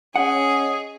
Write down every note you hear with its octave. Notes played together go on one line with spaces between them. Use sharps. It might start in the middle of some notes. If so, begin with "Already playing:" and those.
C#4 G#4 D#5 F#5